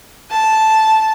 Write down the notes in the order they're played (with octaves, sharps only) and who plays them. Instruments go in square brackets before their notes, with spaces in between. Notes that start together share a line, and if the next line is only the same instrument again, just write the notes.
[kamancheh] A5